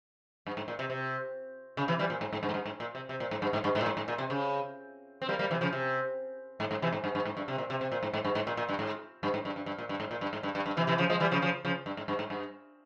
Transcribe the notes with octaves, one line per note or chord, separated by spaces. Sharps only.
G2
G#2
A#2
C3
C3
C#3
C3 E3
E3 G3
A#2
G#2
G#2
G2
G#2
G2
G#2
A#2
C3
C3
A#2
G#2
G2
G#2
G2
G#2
A#2
G#2
G#2
A#2
C3
C#3
C4
G3 A#3
G3 A#3
C3 E3
C#3 F3
C3
G#2
G#2
C3 E3
G#2
G2
G2
G#2
G2
C3
A#2
C3
C3
A#2
G#2
G#2
G2
G#2
A#2
A#2
G2
G#2
G2
G#2
G2
G2
G2
A#2
G2
G#2
A#2
G2
G#2
G2
G2
G2
C3 E3
C3 E3
C#3 F3
F3 G#3
E3 G3
C#3 F3
C#3 F3
C#3 F3
G2
G#2
G2
G#2
G2